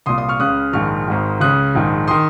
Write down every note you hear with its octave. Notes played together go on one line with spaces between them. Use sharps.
C2 A#2 C6 D#6
C6 D#6
C#6 F6
C#2 C#3 D#6 F#6
A#1 G#2 D#3 C#6 F6
G#1 G#2 D#3
C#2 C#3 D#6 F#6
A#1 G#2 D#3
D#3 C6 D#6